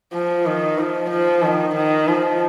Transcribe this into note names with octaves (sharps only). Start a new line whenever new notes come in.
F3
D#3
F3
F3
D#3
D#3
F3